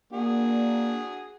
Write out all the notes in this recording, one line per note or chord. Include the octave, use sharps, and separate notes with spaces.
A#3 D4 F#4 G#4